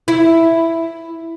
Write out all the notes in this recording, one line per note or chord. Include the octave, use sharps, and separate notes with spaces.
E4